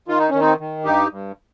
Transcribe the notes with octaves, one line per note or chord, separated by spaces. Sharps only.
D#3 F4
D#4
D#3 C#4
C4 D#4
D#3
G2 D#4 G4
G2